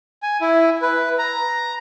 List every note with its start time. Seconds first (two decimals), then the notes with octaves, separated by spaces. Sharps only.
0.23 G#5
0.41 E4
0.82 B4
1.19 A#5